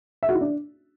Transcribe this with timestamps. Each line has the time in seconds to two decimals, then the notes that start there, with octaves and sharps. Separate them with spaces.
0.23 E5
0.29 F#4
0.35 E4
0.41 D4